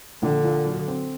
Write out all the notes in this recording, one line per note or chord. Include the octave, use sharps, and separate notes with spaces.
A#1 D3
A#2
F#3
C4